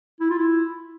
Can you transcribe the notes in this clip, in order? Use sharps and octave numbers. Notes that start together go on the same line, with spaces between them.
E4
F4
E4